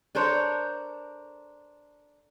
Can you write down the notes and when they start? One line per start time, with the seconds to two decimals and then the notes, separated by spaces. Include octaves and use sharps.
0.15 D4 A4 A#4 C5 C#5